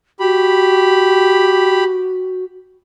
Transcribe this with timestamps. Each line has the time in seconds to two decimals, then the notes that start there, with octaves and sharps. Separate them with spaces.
0.20 F#4 G4 B5